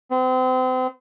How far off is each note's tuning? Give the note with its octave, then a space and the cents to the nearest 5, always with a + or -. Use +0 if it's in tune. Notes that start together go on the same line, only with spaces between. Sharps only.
C4 -35